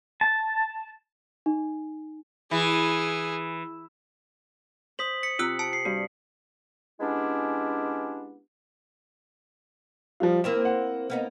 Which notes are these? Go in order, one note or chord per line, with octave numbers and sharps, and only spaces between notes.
A5
D#4
E3 G#4
C5 D#6 B6 F#7
B6 C#7
C3 F4 E6 F#6
A5 C#7
C7
G2 F#4
G#3 B3 C#4 D4 E4 G4
F3 G3 F4
A#3 C4 E4 E7
F#5
A#3 B3 D#4